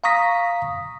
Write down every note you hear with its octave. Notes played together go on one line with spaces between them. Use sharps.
F5 A#5 C#6 D#6 A#6 B6